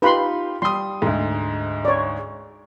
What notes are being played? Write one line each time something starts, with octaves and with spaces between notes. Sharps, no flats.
D#4 F4 G4 B4 B5 C6
G3 C6 D#6
D2 G#2
C#5 D5